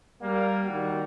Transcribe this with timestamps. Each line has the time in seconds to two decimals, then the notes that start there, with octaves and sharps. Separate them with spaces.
0.22 G3 A#3
0.67 D#3 G3 F#4